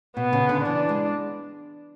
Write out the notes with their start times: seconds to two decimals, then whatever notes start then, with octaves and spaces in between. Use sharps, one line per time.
0.17 B2 B3
0.33 C#3
0.49 D3
0.65 E3 D4
0.89 G#3